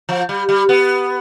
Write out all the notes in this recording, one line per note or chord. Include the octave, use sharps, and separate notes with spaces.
F3
G3
G3
B3